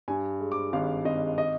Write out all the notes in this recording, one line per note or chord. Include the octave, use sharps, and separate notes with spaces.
G2 G#5
G#3
D6
G#1 F5
G#1 D#5
D#5